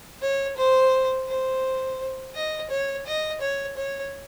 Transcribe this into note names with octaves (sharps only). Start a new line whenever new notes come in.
C#5
C5
C5
D#5
C#5
D#5
C#5
C#5